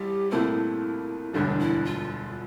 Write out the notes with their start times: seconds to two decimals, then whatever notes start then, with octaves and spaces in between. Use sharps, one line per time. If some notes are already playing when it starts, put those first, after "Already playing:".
Already playing: A1 G3 G4
0.31 C2 A#2 A3 C4 E4
1.33 E1 D2 D3 G3 D4
1.59 E4
1.85 F4